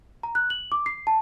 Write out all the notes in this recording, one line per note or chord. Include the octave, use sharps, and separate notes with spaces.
A#5
F#6
F#7
D6
C7
A5